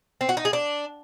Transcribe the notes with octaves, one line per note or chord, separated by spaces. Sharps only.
C4
F#4
D#4
G#4
D4